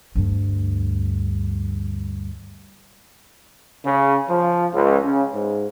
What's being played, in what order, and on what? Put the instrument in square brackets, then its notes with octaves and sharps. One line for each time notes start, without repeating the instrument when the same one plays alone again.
[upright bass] D2 G2
[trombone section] C#3
F3
C#2
C#3
G#2